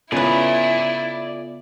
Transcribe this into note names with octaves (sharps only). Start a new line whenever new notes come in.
C#3 B3 E4 F4 A4 B4 D5 G#5